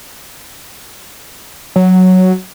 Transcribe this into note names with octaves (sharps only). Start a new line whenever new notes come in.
F#3